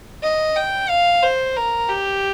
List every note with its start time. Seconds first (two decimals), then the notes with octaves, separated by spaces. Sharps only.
0.23 D#5
0.56 G5
0.89 F5
1.23 C5
1.56 A#4
1.89 G4